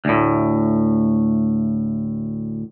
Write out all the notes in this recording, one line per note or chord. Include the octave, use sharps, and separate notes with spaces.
D2 A2